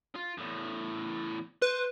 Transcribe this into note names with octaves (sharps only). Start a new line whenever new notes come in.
F4
E2 A2
B4 C5